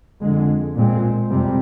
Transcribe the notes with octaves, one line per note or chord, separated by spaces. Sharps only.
F2 D3 G#3
A#2 G#3 C4
F2 C3 G3 C4